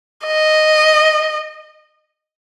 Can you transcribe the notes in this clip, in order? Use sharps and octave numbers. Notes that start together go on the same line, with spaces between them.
D#5